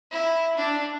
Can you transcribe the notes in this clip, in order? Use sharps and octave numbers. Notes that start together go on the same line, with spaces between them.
E4
D4